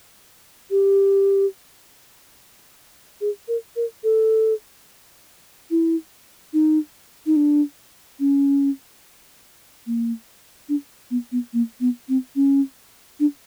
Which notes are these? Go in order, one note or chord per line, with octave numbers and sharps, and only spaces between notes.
G4
G#4
A#4
A#4
A4
E4
D#4
D#4
D4
C#4
A#3
D4
B3
B3
A#3
B3
C4
C#4
D4